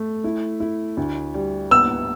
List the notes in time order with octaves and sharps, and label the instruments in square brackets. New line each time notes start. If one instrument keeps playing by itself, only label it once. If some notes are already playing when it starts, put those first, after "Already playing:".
Already playing: [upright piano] A3
E4
E4
D2
G3
[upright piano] B3 [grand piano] E6